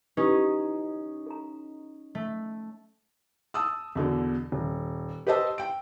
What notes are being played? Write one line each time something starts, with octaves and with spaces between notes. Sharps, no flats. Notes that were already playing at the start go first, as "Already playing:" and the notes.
C#4 D#4 E4 G4 B4
A4 A#5
A3
A5 D#6 E6
E2 B2 D3
D#1
G4 B4 C5 D#5 A5 E6
G5 D7